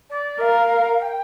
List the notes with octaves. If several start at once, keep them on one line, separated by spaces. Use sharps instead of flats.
D5
A#4 F5
G5